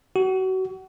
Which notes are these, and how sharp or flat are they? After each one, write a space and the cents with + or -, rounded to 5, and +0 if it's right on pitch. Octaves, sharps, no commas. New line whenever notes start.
F#4 +30